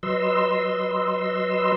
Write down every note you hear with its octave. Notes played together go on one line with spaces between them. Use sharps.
F#3 B4 D#5 C6 E6